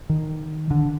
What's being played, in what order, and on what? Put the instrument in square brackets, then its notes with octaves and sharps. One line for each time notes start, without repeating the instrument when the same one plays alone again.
[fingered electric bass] D#3
D3